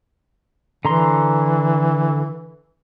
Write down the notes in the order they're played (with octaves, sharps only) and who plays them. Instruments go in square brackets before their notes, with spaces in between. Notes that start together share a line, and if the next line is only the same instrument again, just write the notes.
[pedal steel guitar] D3 A#5 C6 [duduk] E3